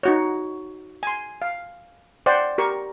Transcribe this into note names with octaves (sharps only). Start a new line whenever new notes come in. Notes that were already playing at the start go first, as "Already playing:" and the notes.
D#4 F#4 C#5
G#5 C6
F5
C5 D5 F#5 G5
G4 A#4 C#6